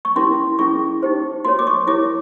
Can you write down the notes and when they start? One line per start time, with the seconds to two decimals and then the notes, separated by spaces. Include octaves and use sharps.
0.05 C#6
0.16 C#4 E4 G4 A#4 C6
0.59 C#4 E4 G#4 C#6
1.03 D#4 G4 C5
1.45 F#4 A#4 C#5 C6
1.59 D6
1.67 C#6
1.87 E4 G4 A#4 C#5 D6